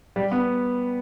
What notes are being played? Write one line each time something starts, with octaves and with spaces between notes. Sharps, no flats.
G3
B3